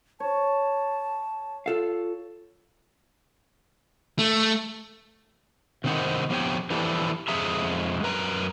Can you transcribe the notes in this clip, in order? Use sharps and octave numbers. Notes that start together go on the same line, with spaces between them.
C#5 A5
F4 A4 F5
A3
C3 D#3 C4 D#4 C5 F#5
F3 B3 G4 C#5 G5
E3 F3 E4 G4 A4 D5
F2 G#3 G#4 E5 A#5
F#2 B4 A#5